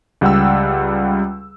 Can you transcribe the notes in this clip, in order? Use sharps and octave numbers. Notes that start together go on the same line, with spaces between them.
C#2 G3 F#5 G5 E6